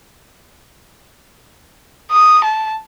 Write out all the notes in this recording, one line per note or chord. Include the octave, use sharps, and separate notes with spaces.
D#6
A5